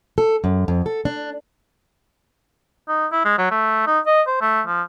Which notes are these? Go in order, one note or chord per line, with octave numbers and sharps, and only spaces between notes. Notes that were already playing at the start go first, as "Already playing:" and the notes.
A4
F#2
F2
A4
D4
D#4
E4
G#3
F#3
A3
D#4
D#5
C5
A3
F3